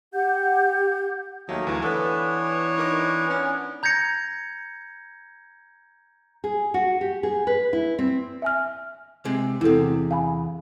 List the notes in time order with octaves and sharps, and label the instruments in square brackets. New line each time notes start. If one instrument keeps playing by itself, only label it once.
[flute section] G4 F#5 G6
[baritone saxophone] D#2 [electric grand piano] F#3 [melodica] A3 A#3 [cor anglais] D#4
[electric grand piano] D2 [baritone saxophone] E3 [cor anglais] F#3
[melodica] B3 D4 [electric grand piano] A4 B4 [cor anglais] C#5
[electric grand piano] D#4 A#4 D6
[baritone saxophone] C#4
[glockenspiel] A#5 G6 G#6 A#6 C#7
[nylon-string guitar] G#4
F#4
G4
G#4
B4
E4
C4
[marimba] E5 G#5 F6
[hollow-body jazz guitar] C3 G#3
[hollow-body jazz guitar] E2 C3 [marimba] E4 A4
[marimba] F5 G#5 B5